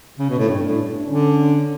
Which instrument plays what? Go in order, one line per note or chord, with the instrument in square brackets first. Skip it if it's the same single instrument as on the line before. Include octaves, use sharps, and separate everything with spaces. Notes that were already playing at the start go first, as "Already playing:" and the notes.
[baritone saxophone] C#3
B2
A2
[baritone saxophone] G2 [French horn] D4
[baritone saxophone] A2
[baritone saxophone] D3 [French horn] C#4